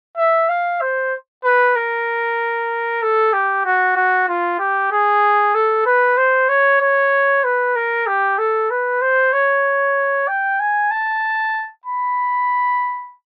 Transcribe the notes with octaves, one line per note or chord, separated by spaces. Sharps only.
E5
F5
C5
B4
A#4
A4
G4
F#4
F#4
F4
G4
G#4
A4
B4
C5
C#5
C#5
B4
A#4
G4
A4
B4
C5
C#5
G5
G#5
A5
B5